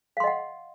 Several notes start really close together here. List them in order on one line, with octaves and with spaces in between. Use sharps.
F5 C6 D#5 F#5